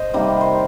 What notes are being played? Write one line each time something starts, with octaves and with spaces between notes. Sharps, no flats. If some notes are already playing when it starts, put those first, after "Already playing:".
Already playing: C5 D#5
C3 D#3 G3 A#3
C5